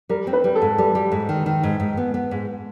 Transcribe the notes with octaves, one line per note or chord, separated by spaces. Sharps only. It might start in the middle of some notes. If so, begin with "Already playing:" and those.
G3 A#4
C4
B4
G3
A4
G#2
G3 A4
G3
G#2
D#3
D#3
G#2
G#2
B3
B3
G#2